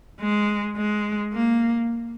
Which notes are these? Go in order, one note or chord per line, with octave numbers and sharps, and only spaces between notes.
G#3
G#3
A#3